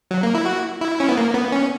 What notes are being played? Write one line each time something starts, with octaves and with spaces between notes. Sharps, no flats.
F#3
A#3
E4
F#4
E4
C#4
B3
A#3
B3
C#4